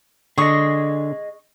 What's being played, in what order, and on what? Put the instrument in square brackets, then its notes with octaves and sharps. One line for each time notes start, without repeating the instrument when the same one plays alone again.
[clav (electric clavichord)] D3 [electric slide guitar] G#4 D#5 [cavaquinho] C#6 D#6